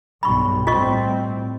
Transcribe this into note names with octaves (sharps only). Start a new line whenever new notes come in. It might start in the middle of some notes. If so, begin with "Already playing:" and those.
B1 G2 B5 C#6
A2 G3 C4 F4 D#5 C#6